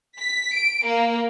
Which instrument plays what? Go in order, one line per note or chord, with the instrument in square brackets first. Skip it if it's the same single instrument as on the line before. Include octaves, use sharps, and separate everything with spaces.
[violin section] B6
D7
A#3